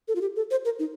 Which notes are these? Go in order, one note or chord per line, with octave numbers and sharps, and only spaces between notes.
A4
F4
G4
A4
C5
A#4
D#4